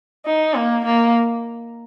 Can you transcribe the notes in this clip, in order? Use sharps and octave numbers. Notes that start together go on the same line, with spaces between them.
D#4
A#3
A#3